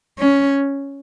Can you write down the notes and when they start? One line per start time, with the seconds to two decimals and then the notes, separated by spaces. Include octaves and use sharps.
0.19 C#4